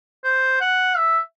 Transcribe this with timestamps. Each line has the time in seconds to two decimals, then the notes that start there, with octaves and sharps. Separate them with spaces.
0.24 C5
0.60 F#5
0.97 E5